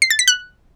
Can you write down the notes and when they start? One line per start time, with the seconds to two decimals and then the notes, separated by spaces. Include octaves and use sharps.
0.02 C7
0.10 A6
0.19 B6
0.28 F#6